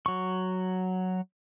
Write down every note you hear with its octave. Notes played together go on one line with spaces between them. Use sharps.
F#3 C#6